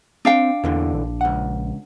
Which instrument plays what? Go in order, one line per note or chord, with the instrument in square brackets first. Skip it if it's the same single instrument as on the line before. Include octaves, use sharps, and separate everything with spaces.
[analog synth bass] C4 [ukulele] D4 F5 G5
[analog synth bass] E2 [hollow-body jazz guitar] A#2 D3 E3
[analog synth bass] A#1
[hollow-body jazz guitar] C#2 F#5